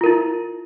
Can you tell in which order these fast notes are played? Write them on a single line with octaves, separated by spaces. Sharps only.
F4 A#4 E4